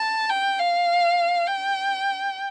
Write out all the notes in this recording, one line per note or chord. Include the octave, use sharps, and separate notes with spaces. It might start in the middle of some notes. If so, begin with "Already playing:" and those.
Already playing: A5
G5
F5
G5